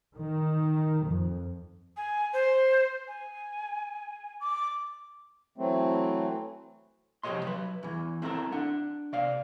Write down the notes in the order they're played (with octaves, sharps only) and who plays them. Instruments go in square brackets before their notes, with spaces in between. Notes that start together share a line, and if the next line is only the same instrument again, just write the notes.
[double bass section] D#3
F2
[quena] G#5
C5
G#5
D6
[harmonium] E3 F#3 A3 C4
[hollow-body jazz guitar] C2 F2 G4 C#5 D#5 C6
F#3 B4
E2 E3
C4 E4 A4 A#4
D4 F#5
C3 D5 F5